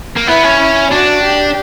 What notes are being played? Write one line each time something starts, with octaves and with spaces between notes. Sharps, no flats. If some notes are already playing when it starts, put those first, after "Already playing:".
A#3
B3 E4
C#4
E4
D4 F#4
G4